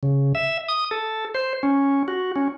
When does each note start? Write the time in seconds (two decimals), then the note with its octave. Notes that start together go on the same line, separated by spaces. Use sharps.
0.03 C#3
0.35 E5
0.68 D#6
0.91 A4
1.35 C5
1.63 C#4
2.08 F#4
2.36 C#4